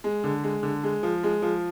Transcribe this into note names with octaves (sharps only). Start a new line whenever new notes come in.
G#3
D3
G#3
D3
G#3
F3
G#3
F3